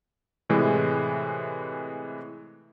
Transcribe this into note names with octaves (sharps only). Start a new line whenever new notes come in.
A2 C3 E3 G#3